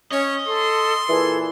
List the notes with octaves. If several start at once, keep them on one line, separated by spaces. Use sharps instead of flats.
C#4 C#5 D#5
A4 C6
A#2 E3 G#4 A4